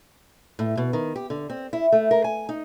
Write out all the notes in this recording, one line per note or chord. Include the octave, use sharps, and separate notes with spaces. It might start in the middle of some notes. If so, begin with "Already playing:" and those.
A2
B2
D#3
G4
D3
C4
E4
A3
A#4
G#5
D#4